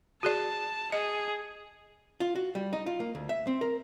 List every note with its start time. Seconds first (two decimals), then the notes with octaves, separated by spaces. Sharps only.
0.23 F#4 G#4 D5 A5
0.92 G#4 D#5
2.20 F4
2.36 F#4
2.55 G3
2.73 D#4
2.86 F4
3.00 A#3
3.15 D2
3.29 E5
3.47 C4
3.61 A#4